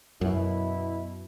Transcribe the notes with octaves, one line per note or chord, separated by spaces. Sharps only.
F#2 B2 E4